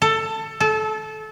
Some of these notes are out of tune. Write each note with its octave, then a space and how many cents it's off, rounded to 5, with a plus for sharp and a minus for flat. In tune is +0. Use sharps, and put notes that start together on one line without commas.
A4 +15
A4 -25